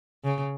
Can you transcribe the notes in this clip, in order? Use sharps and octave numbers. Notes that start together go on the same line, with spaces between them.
C#3